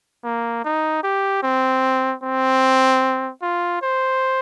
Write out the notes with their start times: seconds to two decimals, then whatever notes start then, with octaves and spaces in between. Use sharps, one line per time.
0.24 A#3
0.64 D#4
1.03 G4
1.43 C4
2.23 C4
3.42 F4
3.82 C5